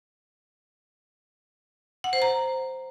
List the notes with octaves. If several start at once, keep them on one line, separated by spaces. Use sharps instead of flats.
F#5
C5
A#5